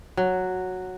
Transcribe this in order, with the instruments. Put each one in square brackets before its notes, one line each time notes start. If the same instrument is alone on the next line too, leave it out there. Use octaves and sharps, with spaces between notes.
[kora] F#3